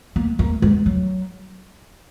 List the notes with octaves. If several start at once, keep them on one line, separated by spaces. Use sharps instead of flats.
A#3
A#3
G#3
F#3